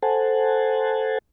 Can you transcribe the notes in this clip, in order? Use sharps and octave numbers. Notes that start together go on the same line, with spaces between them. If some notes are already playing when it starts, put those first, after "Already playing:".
A4 C5 F#5 G#5 A5